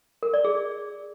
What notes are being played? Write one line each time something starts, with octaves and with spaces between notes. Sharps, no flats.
A#4
D5
G#4